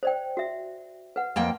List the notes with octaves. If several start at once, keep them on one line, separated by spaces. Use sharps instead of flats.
C5 D5 G5
F#4 E5
B4 F#5
F2 A#3 G5